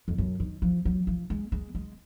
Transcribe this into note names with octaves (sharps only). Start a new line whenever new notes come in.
F2
F#2
D#3
F3
F#3
F3
G#3
G#3
G#3